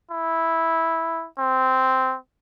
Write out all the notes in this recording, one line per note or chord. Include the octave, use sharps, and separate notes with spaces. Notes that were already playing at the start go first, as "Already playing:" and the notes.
E4
C4